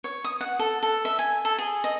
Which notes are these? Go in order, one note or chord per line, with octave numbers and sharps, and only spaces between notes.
C#5
D#6
F#5
A4
A4
E5
G#5
A4
G#4
D#5